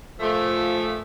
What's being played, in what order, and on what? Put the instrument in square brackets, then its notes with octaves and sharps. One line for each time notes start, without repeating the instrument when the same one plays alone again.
[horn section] A#2 F3 A3